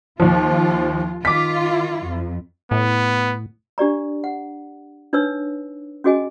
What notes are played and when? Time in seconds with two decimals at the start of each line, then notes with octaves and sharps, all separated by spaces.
0.20 D#2 F3 F4
1.25 D#3 F4 D6 B6
2.05 F2
2.71 A2 B3
3.78 D4 G4 D5 A#5
4.24 F#5
5.13 D4 D#4 B4 C#5 E6
6.04 C#4 F#4 G#4 D#5 G#5